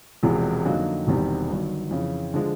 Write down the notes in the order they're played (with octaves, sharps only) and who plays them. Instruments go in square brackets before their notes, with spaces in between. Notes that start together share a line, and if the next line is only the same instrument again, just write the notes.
[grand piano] E1 E2 C3 F3 G#3
F2 D3 F#3 A#3 D#4
E1 E2 C3 D#3 G3
G1 G2 D#3 F#3
F2 C#3 E3
D3 F3 G#3